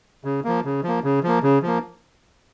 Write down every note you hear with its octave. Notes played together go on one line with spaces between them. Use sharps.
C#3
F3 A#3
C#3
F3 A#3
C#3
F3 A#3
C#3
F3 A#3